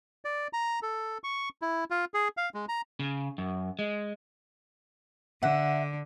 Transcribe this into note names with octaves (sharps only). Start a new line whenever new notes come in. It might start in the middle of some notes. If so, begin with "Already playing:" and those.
D5
A#5
A4
C#6
E4
F4
G#4
F5
G#3
A#5
C#3
F#2
G#3
D3 E5 F#5